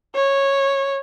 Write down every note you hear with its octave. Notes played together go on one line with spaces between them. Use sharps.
C#5